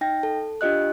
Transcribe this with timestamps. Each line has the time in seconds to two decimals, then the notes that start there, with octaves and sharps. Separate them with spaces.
0.01 D#4 G5 A#6
0.23 A4
0.61 D4 F4 G4 D#5 F#6